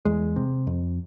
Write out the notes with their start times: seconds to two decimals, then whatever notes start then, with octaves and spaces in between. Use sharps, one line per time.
0.05 E2 G#3
0.36 C3
0.67 F2